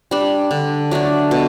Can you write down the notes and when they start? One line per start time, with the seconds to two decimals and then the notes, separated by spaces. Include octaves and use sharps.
0.11 G3 D4
0.51 D3
0.91 F#3 A3 D4
1.31 B2